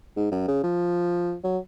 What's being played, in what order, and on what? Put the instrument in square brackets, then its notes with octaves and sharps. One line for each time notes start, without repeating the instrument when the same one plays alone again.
[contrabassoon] G#2
F#2
C#3
F3
F#3